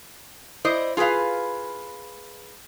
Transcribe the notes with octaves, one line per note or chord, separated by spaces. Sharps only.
E4 C5 D5 D#5
F4 G#4 A#4 B4 F5